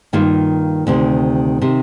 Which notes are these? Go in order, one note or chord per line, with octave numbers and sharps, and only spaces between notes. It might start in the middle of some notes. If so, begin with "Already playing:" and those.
G2 D#3 A#3 F4
D2 C3 D#3
C3 D#3